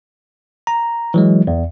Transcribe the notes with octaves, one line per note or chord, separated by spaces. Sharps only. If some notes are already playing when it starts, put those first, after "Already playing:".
A#5
E3 F#3 G#3
E2